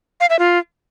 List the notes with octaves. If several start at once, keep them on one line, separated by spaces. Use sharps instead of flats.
F5
E5
F4